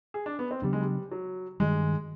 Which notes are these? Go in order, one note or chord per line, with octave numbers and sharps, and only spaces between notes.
G#4
D4
B3
C4
C#3 F#3 G3 B3 D4
G#3
G3
F#3
G2 D#3 G3 G#3